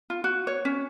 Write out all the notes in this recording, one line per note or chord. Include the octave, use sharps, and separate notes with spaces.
F4
F#4
C#5
C#4